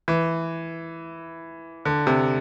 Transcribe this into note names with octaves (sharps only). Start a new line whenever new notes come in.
E3
D3
C3